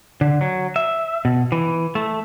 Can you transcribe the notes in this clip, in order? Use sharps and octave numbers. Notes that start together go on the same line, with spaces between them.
D3
F#3
E5
B2
E3
A3